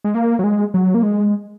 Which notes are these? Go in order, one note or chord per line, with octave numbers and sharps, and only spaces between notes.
G#3
A#3
F#3
G#3
F#3
A#3
G#3